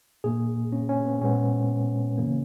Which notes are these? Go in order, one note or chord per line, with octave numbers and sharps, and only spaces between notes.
A#2 A#3 G#4
C#4
C#4
B3
A#2 G#3 B3 C#4
C#3 E3 A#3